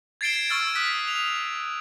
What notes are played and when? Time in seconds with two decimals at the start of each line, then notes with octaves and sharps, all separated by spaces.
0.21 G#6 A6 C7 D7 E7 G7
0.48 C#6 E6 F6 A6 D7 G7
0.75 D#6 F#6 B6
1.07 F7